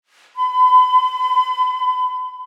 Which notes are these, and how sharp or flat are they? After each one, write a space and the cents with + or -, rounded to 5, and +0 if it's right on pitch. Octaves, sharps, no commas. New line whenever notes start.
B5 +40